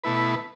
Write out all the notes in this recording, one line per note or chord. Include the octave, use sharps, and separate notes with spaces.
B2 A3 E4 B4